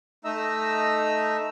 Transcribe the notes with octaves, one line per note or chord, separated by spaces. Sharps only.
A3 D#4 D#5 E5 A#5 E6